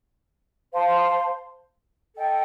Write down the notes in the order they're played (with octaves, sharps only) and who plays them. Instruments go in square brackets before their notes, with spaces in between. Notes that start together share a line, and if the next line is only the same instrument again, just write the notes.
[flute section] C5 F5 A5 C6
A4 D#5 G5